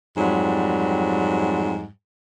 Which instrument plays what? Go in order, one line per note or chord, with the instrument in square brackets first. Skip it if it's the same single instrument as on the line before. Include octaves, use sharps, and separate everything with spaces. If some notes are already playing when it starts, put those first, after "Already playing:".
[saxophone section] F2 G#2 F#3 G3